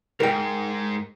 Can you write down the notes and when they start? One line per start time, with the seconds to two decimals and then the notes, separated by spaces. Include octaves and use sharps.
0.20 G#2 A#4 G5